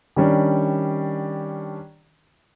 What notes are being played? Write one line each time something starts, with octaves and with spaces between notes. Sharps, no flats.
D#3 G3 C#4 D4